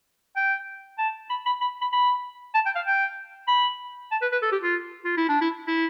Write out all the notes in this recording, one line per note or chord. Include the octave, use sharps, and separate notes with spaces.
G5
A5
B5
B5
B5
B5
B5
A5
G5
F5
G5
B5
A5
B4
B4
A4
G4
F4
F4
E4
D4
E4
E4